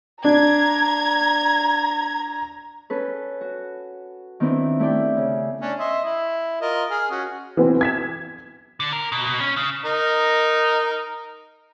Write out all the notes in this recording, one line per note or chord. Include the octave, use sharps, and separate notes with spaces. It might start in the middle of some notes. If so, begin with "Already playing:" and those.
D4 A#5 G#6
C#4 A4 B4
F#4
D#3 B3 C4 D4 E4
A3 E4 G4 D5 G5
C#3
C#4 D4
D#5 E5 C6
E4
F4 A#4 D#5
G#4 F6
C#4 F#4
E3 B3 C4
G#6 B6 E7
D3
A#4
B2
B2
C#4
C#3
D#4 A#4